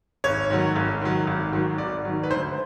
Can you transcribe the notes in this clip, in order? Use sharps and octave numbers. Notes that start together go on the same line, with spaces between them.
G#1 C#5
G#2 D#3 F#3
G#1
G#2 D#3 F#3
G#1
G#2 D#3 F#3
G#1 D5
G#2 D#3 F#3
B4
D2 C5